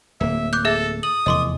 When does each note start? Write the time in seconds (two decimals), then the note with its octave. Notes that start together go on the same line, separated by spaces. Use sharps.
0.20 D1 A#3 E5
0.53 D6 F#6 G6
0.65 G#4 A4 E5 E6
1.03 D#6 F#7
1.26 F1 E2 D#5 C6 D6